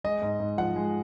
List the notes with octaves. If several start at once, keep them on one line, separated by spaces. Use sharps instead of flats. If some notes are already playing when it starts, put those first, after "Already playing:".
G#3 D#5
G#2
G#2
F3 F#5
G#3